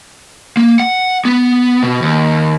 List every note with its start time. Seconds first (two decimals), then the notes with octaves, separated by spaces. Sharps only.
0.57 A#3
0.80 F#5
1.25 B3
1.83 B2
2.02 D#2